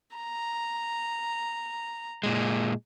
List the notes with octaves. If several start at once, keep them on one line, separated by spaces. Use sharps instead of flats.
A#5
A#2 G#3